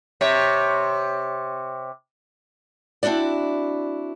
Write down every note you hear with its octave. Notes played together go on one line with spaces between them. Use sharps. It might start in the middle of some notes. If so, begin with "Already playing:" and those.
C3 C#5
C4 D4 E4 F#4 D5